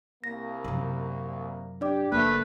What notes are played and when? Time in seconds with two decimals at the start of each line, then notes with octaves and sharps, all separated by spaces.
0.24 C2 A#3 A#6
0.64 F#2 C3
1.81 D4 G4 D5 D6
2.12 F#1 A3 A#3 B4